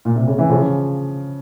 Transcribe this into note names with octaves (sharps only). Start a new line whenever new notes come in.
A#2
C3
C#3
E3
C#3 F3